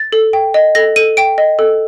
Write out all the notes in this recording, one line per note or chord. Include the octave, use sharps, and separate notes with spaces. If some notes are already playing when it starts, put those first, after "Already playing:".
Already playing: A6
A4
G5
D#5
A4 A#6
A4 D#7
G5 D7
D#5
A4